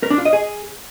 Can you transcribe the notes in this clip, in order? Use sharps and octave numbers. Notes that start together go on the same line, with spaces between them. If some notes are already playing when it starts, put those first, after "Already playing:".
A#4
D4
F4
D#5
G#4